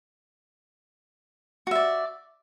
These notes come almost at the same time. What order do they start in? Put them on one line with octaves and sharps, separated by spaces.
F#4 E5 D5